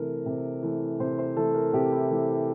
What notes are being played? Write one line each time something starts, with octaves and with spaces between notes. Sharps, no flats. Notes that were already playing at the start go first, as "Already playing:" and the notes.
Already playing: C3 E3 A3 A#4
C3
E3 A3
C3 C5
C5
E3 A3 A4
A#4
C3 G4
E4
E3 A3